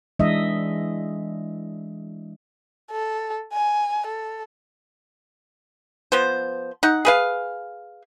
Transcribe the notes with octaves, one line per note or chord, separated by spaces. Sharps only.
E3 G#3 D4 D#5 E5
A4
G#5
A4
F3 B3 C5
D#4 F#5
G#4 B4 F5